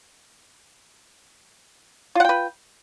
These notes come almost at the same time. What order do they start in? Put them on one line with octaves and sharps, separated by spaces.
F4 F#5 G5 B4